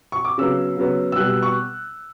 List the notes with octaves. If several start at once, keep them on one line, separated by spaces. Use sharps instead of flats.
C#6
D6
C#3 F#3 B3 E6
C#3 F#3 B3
E6
B2 G3 B3 F#6
E6
C#6